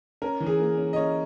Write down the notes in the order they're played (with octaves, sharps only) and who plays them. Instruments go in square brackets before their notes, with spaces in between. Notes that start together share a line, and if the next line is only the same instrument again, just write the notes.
[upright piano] C#4 A#4
E3
G#4
A#3
C#4
D#5
C#4 C#5